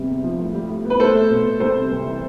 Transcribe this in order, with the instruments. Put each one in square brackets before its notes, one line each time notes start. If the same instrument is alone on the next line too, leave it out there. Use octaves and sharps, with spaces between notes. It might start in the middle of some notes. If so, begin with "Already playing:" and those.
Already playing: [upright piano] C3 G3 B3
E2
F3
A2
G3
A2
B3
B4
A3 A4 C5
A3
B2
B2
G3 A4 C5
C3
C2
E3